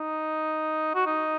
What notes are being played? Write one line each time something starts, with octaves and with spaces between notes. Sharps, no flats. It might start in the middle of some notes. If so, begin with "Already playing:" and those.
Already playing: D#4
F#4
D#4